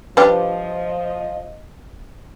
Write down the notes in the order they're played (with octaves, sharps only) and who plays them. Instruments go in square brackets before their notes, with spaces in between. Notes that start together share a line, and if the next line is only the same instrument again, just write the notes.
[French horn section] F3 D#5 [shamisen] G3 D4 G4 [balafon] B4